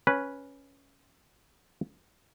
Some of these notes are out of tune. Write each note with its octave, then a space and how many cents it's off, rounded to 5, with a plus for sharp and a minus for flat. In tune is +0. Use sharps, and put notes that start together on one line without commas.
C#4 +0 B4 -5